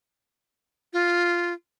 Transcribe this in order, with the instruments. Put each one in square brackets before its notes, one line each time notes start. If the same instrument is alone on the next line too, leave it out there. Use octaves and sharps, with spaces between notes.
[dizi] F4